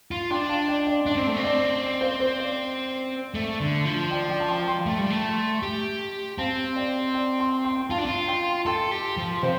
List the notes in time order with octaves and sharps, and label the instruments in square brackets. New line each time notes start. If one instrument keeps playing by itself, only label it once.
[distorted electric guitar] F4
[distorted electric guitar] D4 [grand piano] G5 C6
[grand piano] F5 A5
D5 G5
D5
[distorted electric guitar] D4 [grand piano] D5
[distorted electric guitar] C4
A3
C4
[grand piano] D5
D5
C5 F5
C5
D5
[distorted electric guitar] A3
D3
F3
[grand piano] D5 G5
D5 G5
A5
G5 C6
G5 C6
[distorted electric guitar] A3
G3
A3
G4
[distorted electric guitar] C4 [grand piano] F5 A5
[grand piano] D5 G5
D5 G5
G5 C6
G5 C6
C6
[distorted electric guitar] F4 [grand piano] F5 A5
[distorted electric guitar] D4
F4
[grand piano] G5 C6
[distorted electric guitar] A4 [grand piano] G5 C6
[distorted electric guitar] G4
F3
[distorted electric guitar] C3 [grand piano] C5 F5